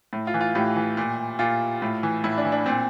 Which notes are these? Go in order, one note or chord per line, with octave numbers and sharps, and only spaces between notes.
A2
F4
E3
F4
A2 G4
E3
A#2
A#2 F4
A2
E3
A2 E4
D4
E3
D4
A#2 C4